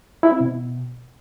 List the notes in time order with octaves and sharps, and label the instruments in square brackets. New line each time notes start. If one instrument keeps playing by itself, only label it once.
[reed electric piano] E4
C4
B2